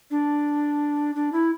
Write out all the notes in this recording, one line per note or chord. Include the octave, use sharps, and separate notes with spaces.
D4
D4
E4